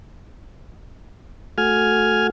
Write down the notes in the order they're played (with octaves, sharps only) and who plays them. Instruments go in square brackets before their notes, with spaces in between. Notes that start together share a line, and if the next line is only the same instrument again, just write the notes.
[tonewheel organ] A3 F#4 [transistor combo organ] G#5 F6